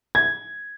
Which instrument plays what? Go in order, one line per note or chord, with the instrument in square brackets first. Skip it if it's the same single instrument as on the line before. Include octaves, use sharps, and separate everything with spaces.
[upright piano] G#6